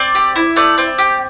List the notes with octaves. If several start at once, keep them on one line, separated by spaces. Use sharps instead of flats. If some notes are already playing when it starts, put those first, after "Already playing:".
Already playing: C4 D5
G4
E4
A3 D5
C4
G4